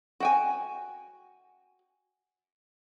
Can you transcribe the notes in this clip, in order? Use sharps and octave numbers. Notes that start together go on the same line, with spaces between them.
F#4 G5 G#5